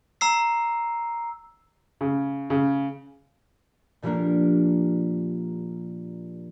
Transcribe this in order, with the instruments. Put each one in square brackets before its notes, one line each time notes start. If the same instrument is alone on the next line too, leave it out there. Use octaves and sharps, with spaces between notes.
[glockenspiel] A#5 E6 C7
[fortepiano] C#3
C#3
[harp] A#2 F3 G3 A#3 D4 A#4